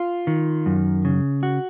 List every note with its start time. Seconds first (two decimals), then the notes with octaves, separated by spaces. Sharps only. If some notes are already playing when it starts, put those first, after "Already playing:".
Already playing: F4
0.27 D#3
0.66 F#2
1.05 C#3
1.43 F#4